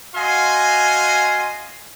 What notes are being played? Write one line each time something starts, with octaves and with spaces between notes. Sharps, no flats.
F#4 D#5 F5 G#5 C6